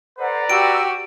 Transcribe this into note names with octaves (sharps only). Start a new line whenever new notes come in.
A4 B4 C5 D5 F#5 A#5
F#4 G4 G5 E6 D7